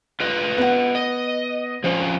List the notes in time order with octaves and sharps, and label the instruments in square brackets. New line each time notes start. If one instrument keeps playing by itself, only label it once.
[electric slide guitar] F4 B4 D#5
[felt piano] B3 F#5
[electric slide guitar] D#5
[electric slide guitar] F3 C4 C#4 [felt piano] C5